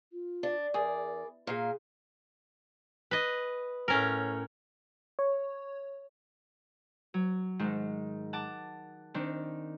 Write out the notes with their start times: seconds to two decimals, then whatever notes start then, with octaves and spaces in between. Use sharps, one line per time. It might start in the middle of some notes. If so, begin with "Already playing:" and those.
0.13 F4
0.43 D4
0.74 E2 G#4 A#4 D5
1.47 A#2 G#4 A#4 F5
3.11 B4 D#5
3.88 A2 C#4 A#4
5.19 C#5
7.14 F#3
7.59 G#2 D#3 G#3
8.33 F#5 A5 D6
9.14 D#3 C4 D4